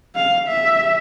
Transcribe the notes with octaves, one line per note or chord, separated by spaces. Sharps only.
F5
E5